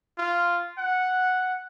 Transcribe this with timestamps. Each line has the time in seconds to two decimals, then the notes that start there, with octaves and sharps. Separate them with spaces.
0.18 F4
0.78 F#5